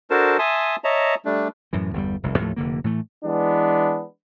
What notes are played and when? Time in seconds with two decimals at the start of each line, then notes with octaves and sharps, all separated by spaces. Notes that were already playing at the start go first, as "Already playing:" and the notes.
0.10 D4 F#4 A4 A#4 C5 A5
0.39 E5 G#5 A5 C6 D#6
0.84 C#5 D#5 E5 A5 A#5
1.25 G3 A3 D4
1.73 F#2 A2 E3
1.93 G1 E2 A#2 G3
2.23 F1 C2
2.38 D#2 A2 F3 A3
2.56 F1 D3 A#3
2.84 A2 E3 A3
3.25 E3 G#3 B3 D4